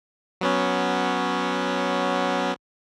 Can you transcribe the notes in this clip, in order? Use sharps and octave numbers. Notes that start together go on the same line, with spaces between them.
F#3 B3 C#4